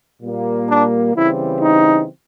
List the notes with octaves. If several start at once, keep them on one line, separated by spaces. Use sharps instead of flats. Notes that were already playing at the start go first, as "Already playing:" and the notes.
A#2 G3 A#3
D4
C#3 E3 G3 C4 E4
D#4